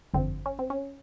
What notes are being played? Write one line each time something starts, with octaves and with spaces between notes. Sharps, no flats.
G1 F2 D3 F3 C4
C#4
C4
C#4